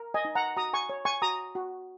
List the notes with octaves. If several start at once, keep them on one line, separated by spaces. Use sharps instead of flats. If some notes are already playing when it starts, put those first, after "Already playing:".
Already playing: A#4
D#5 G#5
D#4
F#5 A#5
F#4 A#5 D#6
G#5 C#6
C#5
G#5 C#6
F#4 A#5 D#6
F#4